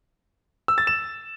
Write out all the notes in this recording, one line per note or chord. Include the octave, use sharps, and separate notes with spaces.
E6
A6
E7